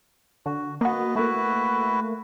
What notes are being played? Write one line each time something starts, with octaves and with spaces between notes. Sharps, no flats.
D3 F#4
A#3 B3 F#4 B4 D#5
A3 A#3 E4 F#4 B4